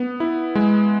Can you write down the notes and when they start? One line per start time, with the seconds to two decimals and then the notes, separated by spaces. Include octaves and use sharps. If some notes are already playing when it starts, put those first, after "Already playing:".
Already playing: B3
0.20 E4
0.55 G#3